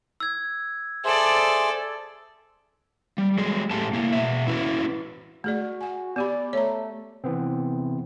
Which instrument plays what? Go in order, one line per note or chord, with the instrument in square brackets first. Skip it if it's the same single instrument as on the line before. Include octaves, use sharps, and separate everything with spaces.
[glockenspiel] E6 G#6
[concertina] G#4 C5 E5 [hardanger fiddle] A4 D5
[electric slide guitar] G3
F#3 G#3 G#4
A2 G4 A4 A5
A#3 E4
B2 E5
C#4 E4 F#4 B4
[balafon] A3 G#4 D5 [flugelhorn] F#4
[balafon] F#5 G#5
[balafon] B3 G4 B5 [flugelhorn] D5
[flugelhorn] A3 [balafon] C#5 A#5
[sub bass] C3 [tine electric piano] E3 B3 C4